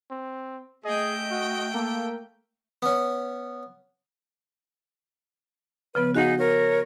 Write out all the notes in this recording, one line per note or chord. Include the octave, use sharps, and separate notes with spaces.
C4
A3 G#4 D#5 G5
F#4
A#3 A4
B3 C#4
C#3 F3 B3 B4
D#4 F#4 G#4 F5 F#5
A#4 C#5